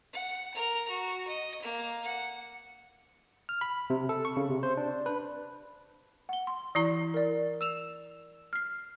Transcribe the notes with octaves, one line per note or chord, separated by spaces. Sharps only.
F#5
A#4 A#5
F#4
D#5
A#3
F#5
F6
B5
C3
A4
C#6
C#3
C3
C5
D4
B4
F#5 G7
C6
E3 E4 A#5
A#4 D5
E6 E7 F7
F6 C7